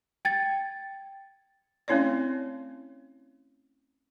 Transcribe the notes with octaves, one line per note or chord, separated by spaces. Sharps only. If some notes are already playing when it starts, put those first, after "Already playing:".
G5 G#6 A6
A3 C4 C#4 E4 C#5 D5